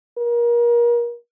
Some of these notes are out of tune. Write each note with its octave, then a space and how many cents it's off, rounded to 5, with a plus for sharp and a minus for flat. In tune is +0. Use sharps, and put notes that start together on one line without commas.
A#4 +30